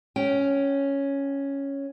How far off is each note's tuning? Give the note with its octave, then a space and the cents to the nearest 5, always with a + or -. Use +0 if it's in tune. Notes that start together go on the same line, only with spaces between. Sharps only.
C#4 +0 G5 -20